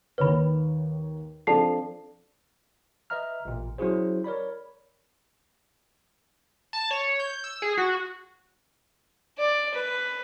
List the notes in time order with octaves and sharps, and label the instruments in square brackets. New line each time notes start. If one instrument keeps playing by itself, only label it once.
[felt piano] D#2 D#3 C#5 [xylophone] B4 B5
[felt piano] F3 C4 D4 [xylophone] A4 A5 C7
[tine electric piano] B4 D#5 E5 A#5 F6
A1 A#2
F#3 C#4 E4 F#4 G#4 C5
A#4 C#5 D5 B5
[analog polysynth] A5
C#5
G6
E6
G#4
F#4
[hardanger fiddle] D5
B4